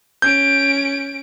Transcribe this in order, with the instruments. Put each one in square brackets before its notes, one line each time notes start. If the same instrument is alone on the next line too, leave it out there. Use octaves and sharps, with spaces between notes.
[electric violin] C#4 D7 [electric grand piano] G6